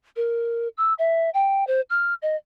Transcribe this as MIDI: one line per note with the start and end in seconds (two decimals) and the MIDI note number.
0.16 0.68 70
0.77 0.93 88
0.99 1.30 76
1.34 1.66 79
1.67 1.81 72
1.90 2.14 89
2.22 2.36 75